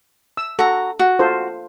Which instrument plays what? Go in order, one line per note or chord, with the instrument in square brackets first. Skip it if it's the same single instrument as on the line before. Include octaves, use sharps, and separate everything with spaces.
[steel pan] E6
[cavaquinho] F#4 A#5 [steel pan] A4
[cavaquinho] F#4
[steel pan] F4 A4 C5